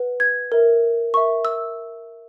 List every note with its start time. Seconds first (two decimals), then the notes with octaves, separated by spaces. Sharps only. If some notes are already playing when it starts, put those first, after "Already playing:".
Already playing: B4 F#5
0.20 G#6
0.52 A#4 E5
1.14 A#4 E5 C#6
1.45 E6